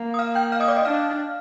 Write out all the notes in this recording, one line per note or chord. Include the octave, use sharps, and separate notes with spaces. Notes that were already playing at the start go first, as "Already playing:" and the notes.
Already playing: A#3
D#6
F5 F6
G5 G6
F5 F6
D#5 D#6
D5 D6
D#5 D#6
D4 F5 F6